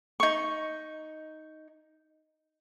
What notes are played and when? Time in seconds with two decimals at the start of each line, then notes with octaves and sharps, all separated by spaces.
0.20 D#4 C#6